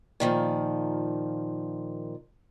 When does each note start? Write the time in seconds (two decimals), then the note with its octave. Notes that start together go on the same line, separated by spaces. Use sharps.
0.20 A#2 D#3 F3